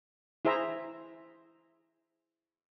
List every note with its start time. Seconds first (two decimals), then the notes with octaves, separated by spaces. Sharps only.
0.45 E4 G#4 C5 E5 A#5